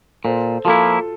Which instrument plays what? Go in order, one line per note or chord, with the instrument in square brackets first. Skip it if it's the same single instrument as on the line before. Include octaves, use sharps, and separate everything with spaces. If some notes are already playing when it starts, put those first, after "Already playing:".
[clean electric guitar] A#2 [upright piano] A4 C5
[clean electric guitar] F3 A#3 E4 [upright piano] F4 A4